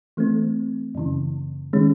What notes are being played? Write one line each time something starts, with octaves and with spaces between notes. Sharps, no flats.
E3 A3 C4
F#2 C#3 E3
D#3 G#3 C#4